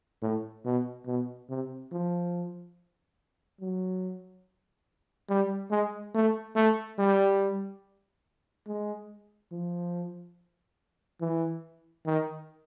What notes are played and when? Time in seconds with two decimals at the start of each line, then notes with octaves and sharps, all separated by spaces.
0.22 A2
0.65 B2
1.07 B2
1.49 C3
1.92 F3
3.61 F#3
5.30 G3
5.71 G#3
6.14 A3
6.56 A3
6.98 G3
8.67 G#3
9.52 F3
11.21 E3
12.06 D#3